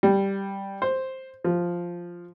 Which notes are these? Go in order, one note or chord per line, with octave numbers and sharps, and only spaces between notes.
G3
C5
F3